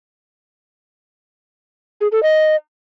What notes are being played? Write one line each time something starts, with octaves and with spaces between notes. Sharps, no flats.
G#4
A4
D#5